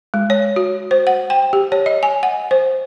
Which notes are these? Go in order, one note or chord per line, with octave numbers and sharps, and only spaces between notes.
G#3
C#5
F#4
C5
F#5
G5
G4
C#5
D#5
G#5
F#5
C5